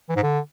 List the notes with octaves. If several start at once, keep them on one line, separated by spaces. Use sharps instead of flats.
E3
G#2
D3